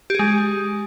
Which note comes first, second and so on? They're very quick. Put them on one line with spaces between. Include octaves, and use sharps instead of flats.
G4 G#4 G#3